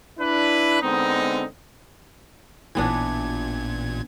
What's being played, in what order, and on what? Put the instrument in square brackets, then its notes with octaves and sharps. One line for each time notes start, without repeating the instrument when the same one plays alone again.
[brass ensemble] D4 E4 B4
D3 G#3 B3 C4 D#4
[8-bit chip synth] A1 A#2 G#6 [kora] E3 B3 D4